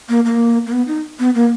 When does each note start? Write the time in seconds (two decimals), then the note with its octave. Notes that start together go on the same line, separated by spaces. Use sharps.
0.09 A#3
0.25 A#3
0.66 A#3
0.72 B3
0.88 D#4
1.19 B3
1.35 A#3